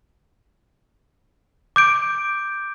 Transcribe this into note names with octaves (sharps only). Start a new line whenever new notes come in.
D6 G6 D7